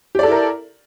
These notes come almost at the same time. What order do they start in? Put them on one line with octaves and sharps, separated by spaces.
G4 D5 A4 E4 A#4